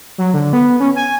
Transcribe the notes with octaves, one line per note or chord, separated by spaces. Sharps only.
F#3
D3
B3
C#4
G#5